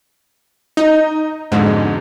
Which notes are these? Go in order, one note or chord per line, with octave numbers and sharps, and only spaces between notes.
D#4 D#5
F2 G#2 B2 D3